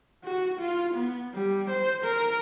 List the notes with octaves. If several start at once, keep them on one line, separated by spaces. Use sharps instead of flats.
F#4
F4
B3
G3
C5
A#4